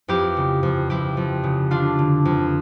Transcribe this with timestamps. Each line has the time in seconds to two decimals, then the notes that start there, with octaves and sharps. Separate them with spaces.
0.08 F2 E4 G4
0.37 C#3
0.63 F2
0.90 F2 E4 G4
1.17 F2
1.44 C#3
1.71 D3 D4 F4
1.99 D3
2.25 F2